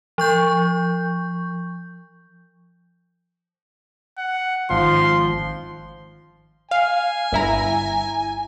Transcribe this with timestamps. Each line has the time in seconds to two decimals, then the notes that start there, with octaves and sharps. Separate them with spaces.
0.18 F3 C#6 G6
4.18 F#5
4.70 G#1 F3 F5 C6
6.71 F5 G#5
7.32 G1 E4 A#5